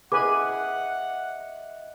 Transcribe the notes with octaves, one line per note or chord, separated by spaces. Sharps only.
G#4 B4 D#5 E5 F#5 G#5 D6